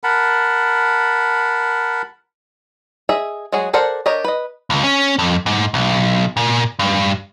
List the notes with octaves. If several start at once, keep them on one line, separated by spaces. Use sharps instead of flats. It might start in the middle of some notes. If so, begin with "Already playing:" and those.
A#4 F#5 A5 B5
G#4 D#5 E5
F#3 G#3 F#4 G#4
A4 A#4 C5 D5 F#5
D4 G4 A#4 C#5 D#5
B4 D#5
C#2
C#4
F2
G#2
B1
A#2
G2